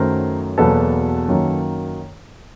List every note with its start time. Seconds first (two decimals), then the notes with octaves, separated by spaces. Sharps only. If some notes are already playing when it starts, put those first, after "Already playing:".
Already playing: F#2 D#3 F#3 A3 A#4 C5
0.58 E2 B2 F#3 A#3 A4 B4
1.28 F#2 D#3 F#3 A#3